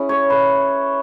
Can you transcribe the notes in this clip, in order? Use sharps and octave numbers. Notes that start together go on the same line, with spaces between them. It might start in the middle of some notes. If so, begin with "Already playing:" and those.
Already playing: C#4 E4 G#4
C#5
B4